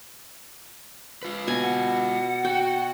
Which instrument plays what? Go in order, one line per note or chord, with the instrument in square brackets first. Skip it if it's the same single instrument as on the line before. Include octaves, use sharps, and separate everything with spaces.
[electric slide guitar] F4 B4
[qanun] B2 G#5
[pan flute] F#5
[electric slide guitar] F#4 [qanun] G5